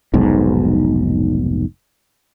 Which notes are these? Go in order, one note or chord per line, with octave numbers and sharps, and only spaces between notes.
F1 B1 G#2